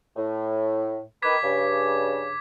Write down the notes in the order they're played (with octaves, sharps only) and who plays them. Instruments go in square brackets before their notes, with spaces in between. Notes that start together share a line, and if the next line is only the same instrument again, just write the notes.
[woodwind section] A2
[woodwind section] D#3 B4 [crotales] D6 G#6 B6
[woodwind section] G2 C#3